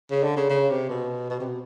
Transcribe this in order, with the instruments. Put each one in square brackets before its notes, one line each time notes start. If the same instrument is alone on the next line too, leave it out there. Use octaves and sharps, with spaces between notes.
[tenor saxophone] C#3
D3
C#3
C#3
C3
B2
B2
C3
B2